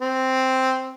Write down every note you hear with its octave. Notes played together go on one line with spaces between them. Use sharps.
C4